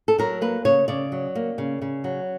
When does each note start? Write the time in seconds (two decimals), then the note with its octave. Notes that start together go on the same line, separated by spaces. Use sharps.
0.08 A4
0.18 F#3 A#4
0.41 A#3 B4
0.65 C#3 C#5
0.88 C#3 D5
1.12 F#3
1.35 A#3
1.58 C#3
1.82 C#3
2.04 F#3